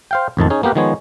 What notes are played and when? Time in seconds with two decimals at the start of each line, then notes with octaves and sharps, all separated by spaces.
0.11 C5 F5 G5
0.37 A1 F2 D#3 A5
0.50 C#4 D#4 G#4
0.63 A#3 B3 G4 A#4 B4
0.75 D#3 F3 G#3 B3 C#5